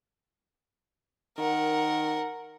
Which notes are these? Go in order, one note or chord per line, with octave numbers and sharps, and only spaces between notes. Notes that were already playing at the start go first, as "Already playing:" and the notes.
D#3 A#4 F#5